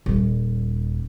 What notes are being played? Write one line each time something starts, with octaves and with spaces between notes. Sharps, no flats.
D#1 G3